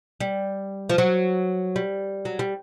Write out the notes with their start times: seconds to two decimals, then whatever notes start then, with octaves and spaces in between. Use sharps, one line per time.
0.20 G3
0.89 F3
0.98 F#3
1.76 G3
2.25 F#3
2.39 G3